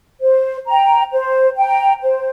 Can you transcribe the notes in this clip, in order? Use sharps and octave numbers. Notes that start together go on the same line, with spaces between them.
C5
G5 A#5
C5
G5 A#5
C5